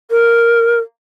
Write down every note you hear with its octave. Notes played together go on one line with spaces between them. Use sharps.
A#4